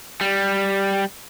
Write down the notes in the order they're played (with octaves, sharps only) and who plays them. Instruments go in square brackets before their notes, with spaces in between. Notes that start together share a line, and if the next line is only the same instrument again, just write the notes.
[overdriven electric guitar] G3